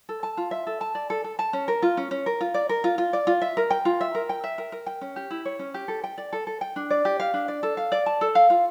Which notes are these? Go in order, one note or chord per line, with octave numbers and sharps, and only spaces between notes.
A4
A5
F4
E5
A4
A5
D5
A4
A4
A5
C#4
A#4
F4
C#4
C#4
A#4
F4
D5
A#4
F4
F4
D5
F4
E5
A#4
G5
F4
E5
A#4
G5
E5
A#4
A#4
G5
C#4
G4
E4
C#5
C#4
G4
A4
G5
D5
A4
A4
G5
D4
D5
G4
F5
D4
D5
A4
F5
D5
A5
A4
F5
F4